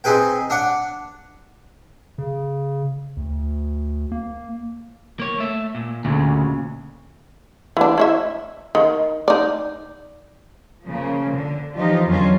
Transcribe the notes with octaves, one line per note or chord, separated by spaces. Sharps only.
C4 D#4 G#4 B4 G5
D4 D5 F#5
C#3
D2
A#3
A#3 C#5
A3 E5
A#2
D2 A#2 C#3
E3 D4
E4 C#5 E5
D#3
D#4 D5
C#3 F3 A#3
D3
E3 F3 D#4 F4 G4
E2 D3 F#3 G3 C#4 F4